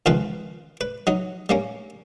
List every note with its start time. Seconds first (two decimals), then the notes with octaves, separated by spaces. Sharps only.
0.06 C#2 D#3 F3 C4 B4
0.81 B4
1.07 F#3 D#4
1.49 G3 A#3 C#4